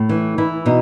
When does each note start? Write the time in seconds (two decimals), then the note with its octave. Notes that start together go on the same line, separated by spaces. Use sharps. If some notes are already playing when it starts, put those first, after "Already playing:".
Already playing: A2
0.09 E3
0.38 E3 E4
0.66 B2 D#4